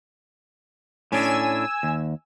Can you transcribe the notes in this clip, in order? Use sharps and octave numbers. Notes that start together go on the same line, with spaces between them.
A2 C#4 D4 G#5 E6
D#2